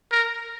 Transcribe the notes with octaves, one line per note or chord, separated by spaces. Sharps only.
A#4